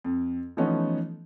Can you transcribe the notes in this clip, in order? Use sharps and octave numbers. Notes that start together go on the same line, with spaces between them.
F2
E3 F3 A3 B3 C#4 D#4